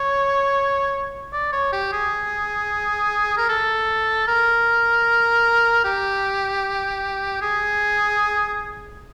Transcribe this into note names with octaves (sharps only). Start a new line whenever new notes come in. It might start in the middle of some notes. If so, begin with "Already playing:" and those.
Already playing: C#5
D5
C#5
G4
G#4
A#4
A4
A#4
G4
G#4